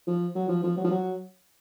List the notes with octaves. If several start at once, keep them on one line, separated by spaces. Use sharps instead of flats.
F3
F#3
F3
F3
F#3
F3
F#3